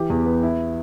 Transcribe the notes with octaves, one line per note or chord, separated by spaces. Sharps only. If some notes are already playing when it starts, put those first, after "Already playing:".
Already playing: E3 G4
E2
B3
E4